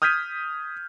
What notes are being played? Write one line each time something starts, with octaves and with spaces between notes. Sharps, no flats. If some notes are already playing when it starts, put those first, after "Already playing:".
D#6 F6 G6 G#6 B6 D#7